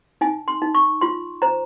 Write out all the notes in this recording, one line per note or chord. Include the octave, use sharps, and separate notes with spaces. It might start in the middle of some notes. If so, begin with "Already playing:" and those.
D#4 G#5
C6
D#4
C#6
F4 C6
C5 A#5